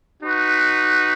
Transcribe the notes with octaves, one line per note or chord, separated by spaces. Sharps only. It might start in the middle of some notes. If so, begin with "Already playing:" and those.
D#4 F#4 B4